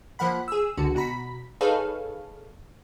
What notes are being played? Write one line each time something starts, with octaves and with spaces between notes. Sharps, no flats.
F3 A#3 F#5 B5
G#4 E6
C#2 D3 F#4
B2 F#4 A#5 B5 B6
D#4 G#4 A4 B4 C#5 F5